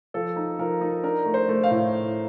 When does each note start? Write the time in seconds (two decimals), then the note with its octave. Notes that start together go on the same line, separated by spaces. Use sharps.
0.14 F3 A4
0.36 D#4
0.59 F3 A#4
0.81 D#4
1.03 D4 A#4
1.25 A3
1.34 C5
1.49 A3
1.64 F5
1.71 A2